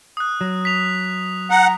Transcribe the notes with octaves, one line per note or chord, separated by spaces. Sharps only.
D#6 F#6
F#3
B6 F7
F#5 A#5